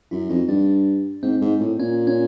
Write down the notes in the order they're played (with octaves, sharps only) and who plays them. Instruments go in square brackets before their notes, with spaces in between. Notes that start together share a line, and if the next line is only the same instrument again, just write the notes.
[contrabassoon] F#2 [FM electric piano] E4
[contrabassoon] F2 [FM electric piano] D#4
[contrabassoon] G2 [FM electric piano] D4
[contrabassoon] G#2 [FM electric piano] C4
[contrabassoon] G#2
A2
[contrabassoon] A#2 [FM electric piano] C#4
[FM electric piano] C#4